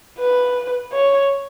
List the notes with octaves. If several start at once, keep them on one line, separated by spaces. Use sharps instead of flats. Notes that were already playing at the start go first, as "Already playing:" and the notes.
B4
C#5